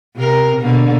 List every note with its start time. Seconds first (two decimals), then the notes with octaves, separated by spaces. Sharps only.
0.15 C3 C4 A#4
0.60 B2 D3 A#3